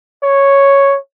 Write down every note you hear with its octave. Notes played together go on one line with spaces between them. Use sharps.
C#5